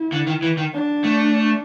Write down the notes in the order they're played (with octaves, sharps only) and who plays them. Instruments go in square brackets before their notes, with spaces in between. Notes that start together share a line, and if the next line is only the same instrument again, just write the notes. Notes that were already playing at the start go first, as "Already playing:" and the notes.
Already playing: [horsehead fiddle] E4
[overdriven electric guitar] D3
D#3
E3
D#3
[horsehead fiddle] D4
[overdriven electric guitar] A3